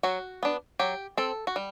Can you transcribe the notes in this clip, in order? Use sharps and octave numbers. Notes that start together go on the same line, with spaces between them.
F#3 F#4
B3 D4
F#3 G4
C4 A4
F#4
G3